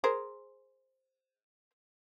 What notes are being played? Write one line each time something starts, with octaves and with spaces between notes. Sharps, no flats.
G#4 A#4 C5